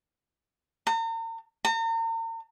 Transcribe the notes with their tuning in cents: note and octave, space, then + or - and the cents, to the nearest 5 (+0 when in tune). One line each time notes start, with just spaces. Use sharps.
A#5 -40
A#5 -40